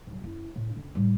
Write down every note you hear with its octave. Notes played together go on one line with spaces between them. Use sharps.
G#2 F#3
F#2 E4
A2
F#2 D3
A2 G3